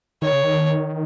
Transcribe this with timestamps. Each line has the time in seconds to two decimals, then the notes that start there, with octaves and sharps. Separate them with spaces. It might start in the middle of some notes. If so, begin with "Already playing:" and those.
0.22 D#3 C#5
0.33 C#3
0.44 D#3